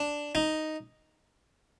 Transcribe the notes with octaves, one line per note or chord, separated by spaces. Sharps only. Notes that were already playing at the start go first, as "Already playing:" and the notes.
Already playing: D4
D#4